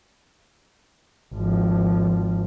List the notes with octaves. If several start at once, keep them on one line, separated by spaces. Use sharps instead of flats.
G#1 F3